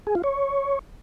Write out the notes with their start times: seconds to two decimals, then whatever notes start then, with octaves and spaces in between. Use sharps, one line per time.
0.07 G#4
0.15 F4
0.24 C#5